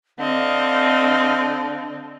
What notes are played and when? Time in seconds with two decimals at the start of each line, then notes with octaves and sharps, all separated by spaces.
0.19 D3 C4 D#5 F5